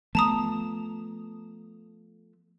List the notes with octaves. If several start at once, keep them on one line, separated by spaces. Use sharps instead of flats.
F3 A3 B3 A5 A#5 D#6